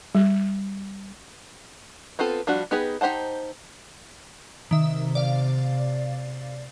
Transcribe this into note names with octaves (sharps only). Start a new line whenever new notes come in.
G3
B3 C4 F4 A4
F3 G3 D4 F#4
B3 D#4 G4 G#4 B4
D#4 G4 C5 F#5 A5
C3 D#3 E5
D5 F5